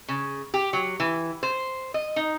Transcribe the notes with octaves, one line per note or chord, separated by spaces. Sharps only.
C#3
G4
F#3
E3
C5
D#5
D#4